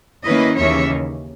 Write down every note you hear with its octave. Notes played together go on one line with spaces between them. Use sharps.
D#3 A#3 C#4 E4 B4 D#5
D#2 C#3 E3 A#3 D#4 C#5 E5